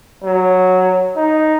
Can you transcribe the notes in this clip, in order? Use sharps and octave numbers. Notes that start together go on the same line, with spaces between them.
F#3
D#4